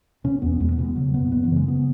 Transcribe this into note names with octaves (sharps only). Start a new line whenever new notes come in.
B2 C#4
E2 B3
E2 G#3
B3
B2
G#3
C#3 F#3
F#2 B3
F#2 B3
E3
C#3
G#3
C#3 B3